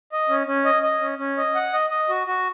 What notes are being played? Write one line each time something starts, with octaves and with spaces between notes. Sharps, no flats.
D#5
C#4
C#4
D#5
D#5
C#4
C#4
D#5
F#5
D#5
D#5
F#4
F#4